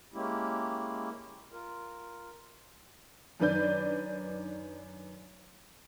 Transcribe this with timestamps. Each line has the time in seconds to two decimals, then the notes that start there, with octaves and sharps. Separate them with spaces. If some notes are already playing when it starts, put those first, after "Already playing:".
0.14 G#3 A#3 C#4 E4 G4
1.52 F4 A#4
3.40 F#2 D#3 D4 B4 D5 G6